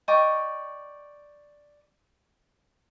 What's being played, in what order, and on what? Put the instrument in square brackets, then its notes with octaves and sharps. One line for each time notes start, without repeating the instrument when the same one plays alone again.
[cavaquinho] D5 D#5 G5 C#6